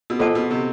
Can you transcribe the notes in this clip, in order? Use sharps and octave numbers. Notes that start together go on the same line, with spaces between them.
B2
A#2 A4 C5 D#5 F#5 A5
B2
C3